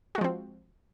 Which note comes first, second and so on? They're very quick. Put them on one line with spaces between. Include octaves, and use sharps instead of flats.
F#4 G#3 F3 C4